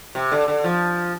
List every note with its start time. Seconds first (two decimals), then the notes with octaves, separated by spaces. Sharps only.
0.15 C3
0.32 D3
0.48 D3
0.64 F3